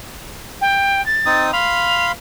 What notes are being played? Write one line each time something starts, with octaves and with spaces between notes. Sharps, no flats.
G5
A6
C4 D#4 D#6
F5 B5 C6 F7